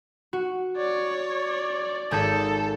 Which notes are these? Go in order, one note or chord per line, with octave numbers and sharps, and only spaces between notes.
F#4
C#5 D5
D5
G#1 G#4 A4 G6